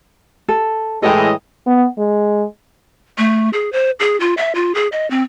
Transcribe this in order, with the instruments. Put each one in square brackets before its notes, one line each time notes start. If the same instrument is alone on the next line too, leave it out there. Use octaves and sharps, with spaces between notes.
[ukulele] A4
[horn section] A2 E3 D#5 [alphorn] G#3 [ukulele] A4 C#5 G5
[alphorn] B3
G#3
[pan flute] A3
G#4
C5
G#4
F4
E5
F4
G#4
D#5
C4